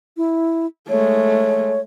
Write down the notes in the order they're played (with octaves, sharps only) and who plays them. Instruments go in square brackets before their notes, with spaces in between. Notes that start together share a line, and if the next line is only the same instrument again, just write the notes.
[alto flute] E4
[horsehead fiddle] G#3 A3 [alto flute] C#5